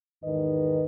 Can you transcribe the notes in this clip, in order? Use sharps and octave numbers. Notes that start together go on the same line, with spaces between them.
E2 G#2 D#3 B4 D#5